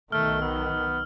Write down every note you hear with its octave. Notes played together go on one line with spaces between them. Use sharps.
B1 D#3 A3 F6
B3 E6